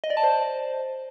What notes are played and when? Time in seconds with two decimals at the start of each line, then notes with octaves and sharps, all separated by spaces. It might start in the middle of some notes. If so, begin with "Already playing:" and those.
0.04 D#5
0.10 D5
0.17 A5
0.24 C5